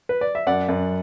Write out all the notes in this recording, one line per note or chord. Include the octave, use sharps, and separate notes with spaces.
B4
D5
E5
F#2 D5 F#5
F#2